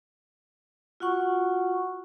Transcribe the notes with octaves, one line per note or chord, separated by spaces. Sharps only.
F4 F#4 F#5 C#6